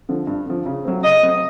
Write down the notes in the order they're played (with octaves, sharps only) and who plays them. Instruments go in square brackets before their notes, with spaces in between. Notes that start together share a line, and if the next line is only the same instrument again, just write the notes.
[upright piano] D3 F3
G2
D3 F3
C#3
F#3 A3 C4
[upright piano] C#3 [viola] D#5
[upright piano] F#3 A3 C4